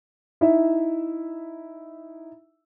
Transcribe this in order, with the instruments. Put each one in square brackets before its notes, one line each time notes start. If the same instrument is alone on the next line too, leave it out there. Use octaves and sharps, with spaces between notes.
[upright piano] D#4 E4 E5